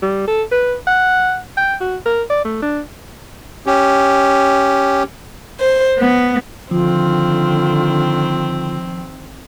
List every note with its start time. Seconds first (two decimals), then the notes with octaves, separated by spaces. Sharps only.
0.02 G3
0.28 A4
0.52 B4
0.87 F#5
1.57 G5
1.80 F#4
2.06 A#4
2.30 D5
2.45 A3
2.62 D4
3.66 C#4 G4
5.60 C5
5.98 B3
6.71 D3 D#3 F3 C4 F4